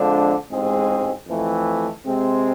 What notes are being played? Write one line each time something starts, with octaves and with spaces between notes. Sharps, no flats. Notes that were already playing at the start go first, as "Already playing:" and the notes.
Already playing: F2 D3 F3 G#3 D4
A1 G#2 G#3 C4 G#4
F2 E3 A3
C3 G#3 C4